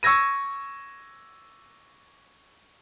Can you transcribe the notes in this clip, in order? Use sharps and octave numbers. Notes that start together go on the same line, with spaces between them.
C#6 E6 G#6 A#6 D#7